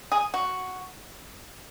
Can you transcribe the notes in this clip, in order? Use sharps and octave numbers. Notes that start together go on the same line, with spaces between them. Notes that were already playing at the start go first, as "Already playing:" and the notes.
G#4
F#4